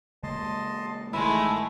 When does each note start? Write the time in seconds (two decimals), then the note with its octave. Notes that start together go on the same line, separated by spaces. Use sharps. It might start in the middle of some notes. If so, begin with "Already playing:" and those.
0.23 C#3 G#3 A#3 D#5 A5 C6
1.13 A1 D#3 G#3 A3 E4 B5